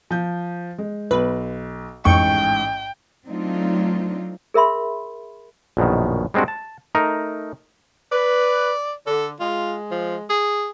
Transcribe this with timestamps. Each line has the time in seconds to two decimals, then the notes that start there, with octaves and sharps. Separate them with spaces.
0.11 F3 G6
0.78 G#3
1.11 B1 B4
2.05 A1 F2 G#2 G5 C#6
3.26 F#3 A3 C4 D4 D#4 F4
4.54 G#4 A#4 E5 B5 C6
5.77 A#1 F#2 B2 D#3
6.34 G3 G#3 C4 D4 F#4
6.48 A5
6.95 A3 D#4 A#4
8.12 B4 D5
9.07 D3 A4
9.40 G#3 F4
9.91 F3
10.30 G#4